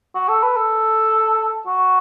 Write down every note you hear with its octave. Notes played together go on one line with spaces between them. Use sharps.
F#4
A4
B4
A4
F#4